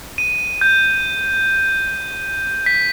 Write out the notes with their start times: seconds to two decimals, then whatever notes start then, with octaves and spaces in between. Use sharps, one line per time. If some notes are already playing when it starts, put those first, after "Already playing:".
0.18 D#7
0.61 G6
2.66 B6